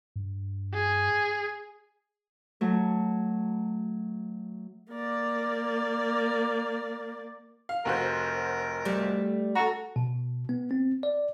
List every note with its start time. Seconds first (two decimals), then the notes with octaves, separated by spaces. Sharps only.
0.16 G2
0.74 G#4
2.61 F#3 A3
4.92 A#3 D5
7.69 F5
7.85 F1 F#4 A#4 C5
8.85 G3 A3
9.55 F#4 A4 A#5
9.96 B2
10.49 B3
10.71 C4
11.03 D5